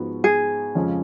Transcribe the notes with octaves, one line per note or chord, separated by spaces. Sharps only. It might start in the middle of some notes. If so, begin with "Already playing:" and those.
Already playing: G#2 F3 B3 F#4
G#4
F2 C#3 F3 G#3 C#4